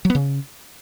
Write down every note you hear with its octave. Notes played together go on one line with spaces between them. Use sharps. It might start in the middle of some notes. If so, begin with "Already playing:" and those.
F#3
B3
C#3